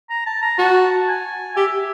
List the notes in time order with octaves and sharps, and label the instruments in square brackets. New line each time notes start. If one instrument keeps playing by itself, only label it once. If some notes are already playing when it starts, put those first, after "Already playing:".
[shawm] A#5
A5
A#5
[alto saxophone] F#4 [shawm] A5
[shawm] G#5
[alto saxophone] G4 [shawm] E5